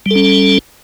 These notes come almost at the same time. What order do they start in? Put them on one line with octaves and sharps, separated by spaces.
G3 A4 C#4